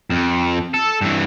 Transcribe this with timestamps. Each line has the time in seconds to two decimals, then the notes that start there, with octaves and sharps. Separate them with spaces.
0.10 F2
0.74 A4
1.01 G2 E3